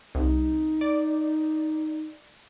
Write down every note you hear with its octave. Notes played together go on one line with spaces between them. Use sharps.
C2 D#4
D5